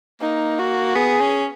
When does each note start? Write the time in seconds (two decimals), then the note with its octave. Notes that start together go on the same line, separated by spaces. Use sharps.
0.21 A#3 D#4
0.59 F#4
0.95 B3 G#4
1.20 C#4